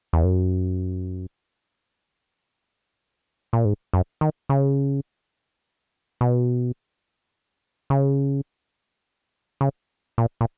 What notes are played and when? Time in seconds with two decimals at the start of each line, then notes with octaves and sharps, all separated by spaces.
0.13 E2
0.24 F#2
3.53 A#2
3.65 G#2
3.93 F#2
4.21 D#3
4.49 C#3
6.21 B2
7.90 C#3
9.61 C#3
10.18 A#2
10.41 A#2